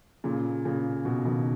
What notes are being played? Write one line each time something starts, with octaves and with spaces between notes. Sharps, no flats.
A#2 C#3
A#2 C#3
B2
B2 D#3